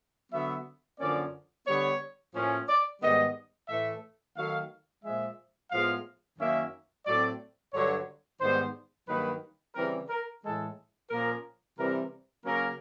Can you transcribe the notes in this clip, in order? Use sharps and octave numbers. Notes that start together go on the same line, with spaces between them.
D3 F#3 B3 E5
F#2 D3 F3 A#3 C#4 D5
D3 G3 B3 C#5
A2 F3 A#3 C#4
D5
G#2 D#3 G3 B3 D#5
A2 E3 A3 E5
D#3 F#3 A3 F5
A#2 F3 G#3 E5
A2 F3 G#3 B3 F5
F#2 D#3 F#3 A#3 C#4 E5
A2 F#3 A3 C4 D5
G2 D3 F#3 C#5
G#2 D#3 G3 B3 C5
G2 D#3 F#3 A#3 B4
C#3 E3 G3 C4 A#4
A#4
A2 E3 G#3 A4
A#2 F3 A#3 C#4 A#4
C3 E3 G3 C4 A#4
C#3 F#3 A#3 C#4 A#4